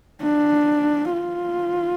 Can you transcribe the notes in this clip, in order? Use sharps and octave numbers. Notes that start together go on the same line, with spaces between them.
D4
F4